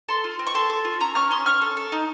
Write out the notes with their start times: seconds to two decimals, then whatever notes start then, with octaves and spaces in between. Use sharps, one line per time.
0.09 A4 A5 C6
0.24 F4
0.39 C4
0.47 C#6
0.54 A4 A5 C6
0.70 A4
0.85 F4
1.00 C#4 A#5 C#6
1.15 C#4 C#6 F6
1.31 C#4 C6 D#6
1.46 C#4 C#6 F6
1.62 A4
1.77 A4
1.92 D#4